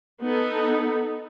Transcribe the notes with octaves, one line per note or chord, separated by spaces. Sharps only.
B3 D#4 A4